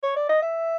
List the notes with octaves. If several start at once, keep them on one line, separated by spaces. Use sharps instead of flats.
C#5
D5
D#5
E5